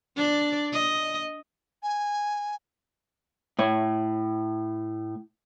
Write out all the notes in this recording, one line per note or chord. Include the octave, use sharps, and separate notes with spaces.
D4 D5
D#5
G#5
A2 C#5